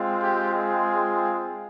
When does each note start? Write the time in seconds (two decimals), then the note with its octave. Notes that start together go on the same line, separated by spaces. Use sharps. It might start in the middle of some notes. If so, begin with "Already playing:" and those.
Already playing: G#3 C4 F4
0.22 G4
0.53 G#4